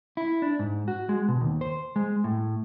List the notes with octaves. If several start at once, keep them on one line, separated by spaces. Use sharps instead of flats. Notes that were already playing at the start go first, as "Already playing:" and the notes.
E4
D4
G#2
F#4
G#3
B2
D#2
C5
G#3
A2